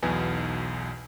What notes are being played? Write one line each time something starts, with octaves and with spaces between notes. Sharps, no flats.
B1 E2 B2 B3 D#4 G#5